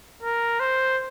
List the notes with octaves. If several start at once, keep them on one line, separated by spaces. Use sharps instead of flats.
A#4
C5